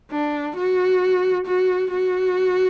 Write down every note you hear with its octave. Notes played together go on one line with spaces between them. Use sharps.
D4
F#4
F#4
F#4